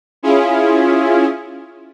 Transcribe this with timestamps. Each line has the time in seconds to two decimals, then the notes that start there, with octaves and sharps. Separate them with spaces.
0.23 C#4 E4 F4 G#4